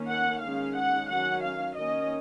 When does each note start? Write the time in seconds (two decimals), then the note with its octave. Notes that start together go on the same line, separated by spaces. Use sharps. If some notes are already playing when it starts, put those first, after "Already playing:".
Already playing: D#3 A#3 C#4
0.08 F#5
0.41 D#3 G#3 C#4 F5
0.76 F#5
1.08 D#3 F#3 C#4 F#5
1.42 F5
1.76 D#3 A#3 C#4 D#5